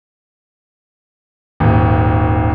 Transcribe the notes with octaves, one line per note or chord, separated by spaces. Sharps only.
D#1 G#1